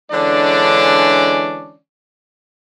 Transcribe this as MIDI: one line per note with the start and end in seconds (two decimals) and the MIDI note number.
0.12 1.77 50
0.12 1.77 52
0.12 1.77 56
0.12 1.77 61
0.12 1.77 62
0.12 1.77 74